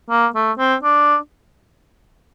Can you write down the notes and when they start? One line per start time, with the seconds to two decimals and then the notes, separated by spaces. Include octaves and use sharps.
0.10 A#3
0.35 A3
0.58 C4
0.83 D4